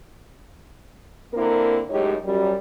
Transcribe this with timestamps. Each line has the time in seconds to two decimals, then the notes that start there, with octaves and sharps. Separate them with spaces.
1.34 D3 A#3 C4 E4 A#4
1.90 F#2 A2 G#3 D#4 G4 C#5
2.25 F#2 G3